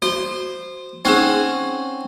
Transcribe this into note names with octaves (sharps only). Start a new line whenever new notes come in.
F#4 C5
C4 C#4 D#4 G#4 F#5